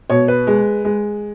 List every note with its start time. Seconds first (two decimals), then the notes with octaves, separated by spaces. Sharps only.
0.10 B2 C#5
0.28 B4
0.47 G#3
0.85 G#3